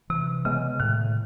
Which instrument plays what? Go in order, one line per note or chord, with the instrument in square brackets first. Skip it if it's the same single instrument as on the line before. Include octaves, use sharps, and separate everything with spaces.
[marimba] C3 [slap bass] E3
[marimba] C#3 [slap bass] G#3 B3
[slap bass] A2 [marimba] D#3